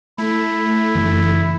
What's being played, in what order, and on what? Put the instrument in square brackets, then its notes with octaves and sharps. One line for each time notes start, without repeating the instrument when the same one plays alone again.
[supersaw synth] A3 [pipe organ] E4
[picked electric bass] F#1 E3